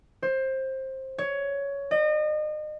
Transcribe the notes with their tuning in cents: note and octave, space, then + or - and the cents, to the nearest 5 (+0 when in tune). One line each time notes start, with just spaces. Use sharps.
C5 +20
C#5 +15
D#5 -35